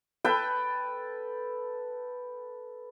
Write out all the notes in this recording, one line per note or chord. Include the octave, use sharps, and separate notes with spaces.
A4 B4 G5 A5